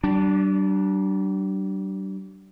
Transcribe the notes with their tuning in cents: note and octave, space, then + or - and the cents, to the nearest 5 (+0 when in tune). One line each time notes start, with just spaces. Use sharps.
G3 -40 D4 +0